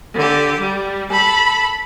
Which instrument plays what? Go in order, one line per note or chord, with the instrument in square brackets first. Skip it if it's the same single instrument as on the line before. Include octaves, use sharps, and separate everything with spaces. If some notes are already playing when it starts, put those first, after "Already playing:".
[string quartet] D3 G4
G3
A4 B5